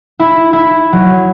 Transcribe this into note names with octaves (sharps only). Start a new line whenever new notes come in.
E4
E4
F#3